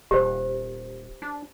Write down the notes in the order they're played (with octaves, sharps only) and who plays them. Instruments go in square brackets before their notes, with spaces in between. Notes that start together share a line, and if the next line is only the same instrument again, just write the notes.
[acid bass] D#1 [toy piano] G4 C5
[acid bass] D4